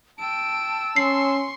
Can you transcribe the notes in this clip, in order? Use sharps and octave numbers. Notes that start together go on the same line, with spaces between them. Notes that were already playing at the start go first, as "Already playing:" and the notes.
G5 A5 E6 D7
C#4 C6 C#6 C7